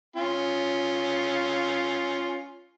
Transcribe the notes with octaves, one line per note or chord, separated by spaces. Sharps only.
C#4 F4